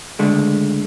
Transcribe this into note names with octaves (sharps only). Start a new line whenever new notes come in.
C#2 D3 G#3 A3